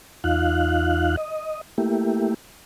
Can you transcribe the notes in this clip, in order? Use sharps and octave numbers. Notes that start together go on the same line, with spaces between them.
E2 D#4 F4 F5 F#6
D#5
A3 A#3 E4 G4